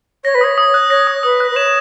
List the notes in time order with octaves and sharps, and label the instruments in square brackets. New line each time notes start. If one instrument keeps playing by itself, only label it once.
[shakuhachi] C#5 [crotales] A#6
[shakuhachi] B4
[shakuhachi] C#5 [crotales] D#6
[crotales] D#6
F#6
[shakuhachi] C#5 [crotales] A#6
[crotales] D#6
[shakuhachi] B4 [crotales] D#6
[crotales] F#6
[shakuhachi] B4
[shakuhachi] C#5 [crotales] E7